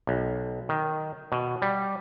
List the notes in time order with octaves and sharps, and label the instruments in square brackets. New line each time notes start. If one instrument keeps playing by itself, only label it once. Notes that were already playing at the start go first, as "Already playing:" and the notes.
[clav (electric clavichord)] B1
D#3
B2
G3